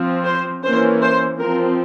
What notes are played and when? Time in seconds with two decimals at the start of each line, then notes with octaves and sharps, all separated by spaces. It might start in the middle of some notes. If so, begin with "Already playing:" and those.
Already playing: F3 C4
0.25 C5
0.63 E3 A#3 C#4 C5
1.02 C5
1.38 F3 C4 A#4